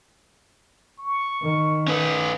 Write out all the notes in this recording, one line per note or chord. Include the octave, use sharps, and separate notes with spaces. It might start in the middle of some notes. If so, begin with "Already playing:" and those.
C#6
D#3
C#4 B4